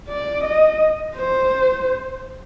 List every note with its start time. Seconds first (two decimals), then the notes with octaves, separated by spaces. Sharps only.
0.09 D5
0.44 D#5
1.15 C5